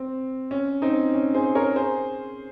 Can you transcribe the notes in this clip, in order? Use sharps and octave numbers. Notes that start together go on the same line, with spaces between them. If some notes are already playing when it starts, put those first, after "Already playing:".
Already playing: C4
C#4
C4 D#4
C#4
G#4 C5
A#4 C#5
G#4 C5